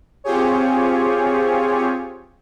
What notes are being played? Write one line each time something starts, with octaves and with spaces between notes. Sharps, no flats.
C4 F4 G4 G#4 C#5